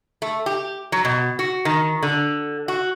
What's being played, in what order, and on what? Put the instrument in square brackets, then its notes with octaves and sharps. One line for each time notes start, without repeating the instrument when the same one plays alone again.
[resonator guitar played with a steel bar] A3
G4
F#3
B2
F#4
D#3
D3
F#4